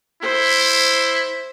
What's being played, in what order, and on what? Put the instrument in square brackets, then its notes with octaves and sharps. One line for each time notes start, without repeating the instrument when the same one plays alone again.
[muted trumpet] E4 [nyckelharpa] C5